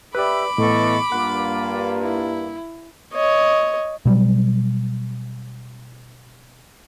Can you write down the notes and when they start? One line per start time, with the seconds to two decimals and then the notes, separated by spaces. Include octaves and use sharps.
0.15 G4 B4 D5 E5 B5 D6 E6
0.58 A2 E3 B3 A4 D#5 C#6
1.12 G2 A#3 F4 F#5
2.02 E4
3.13 C#5 D#5
4.05 B2 F#3 G3